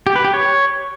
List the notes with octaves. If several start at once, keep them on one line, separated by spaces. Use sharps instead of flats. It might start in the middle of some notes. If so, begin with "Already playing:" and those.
G4
B4
G4
C#5